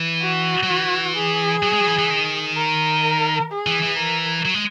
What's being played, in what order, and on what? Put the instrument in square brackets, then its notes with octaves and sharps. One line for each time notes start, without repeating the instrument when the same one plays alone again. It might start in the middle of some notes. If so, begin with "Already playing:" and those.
Already playing: [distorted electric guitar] E3
[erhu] F#4
[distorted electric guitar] F#3
E3
[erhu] G#4
[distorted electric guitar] F#3
G#3
F#3
E3
E3
D#3
[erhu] A#4
G#4
[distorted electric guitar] E3
E3
[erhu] A#4
[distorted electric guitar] F#3
G#3